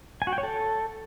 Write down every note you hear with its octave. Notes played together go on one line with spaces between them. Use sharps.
G#5
F#4
G5
C#5
A4